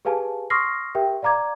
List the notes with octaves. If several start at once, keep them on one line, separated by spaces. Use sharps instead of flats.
G4 G#4 B4 F5 G#5 A5
C6 C#6 D#6 F6 A#6 C7
G4 A#4 E5 G5
D5 F5 A#5 D6 G#6